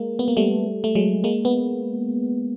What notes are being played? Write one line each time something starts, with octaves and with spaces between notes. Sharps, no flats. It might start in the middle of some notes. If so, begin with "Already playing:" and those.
Already playing: G#3 A#3
B3
A#3
G3 A3
A3
F#3 G#3
G#3 A#3
B3